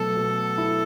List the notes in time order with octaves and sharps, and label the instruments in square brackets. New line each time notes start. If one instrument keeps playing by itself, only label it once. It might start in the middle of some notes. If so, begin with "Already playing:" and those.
Already playing: [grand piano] B2 F#3 A3 [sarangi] A4
[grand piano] B2
E4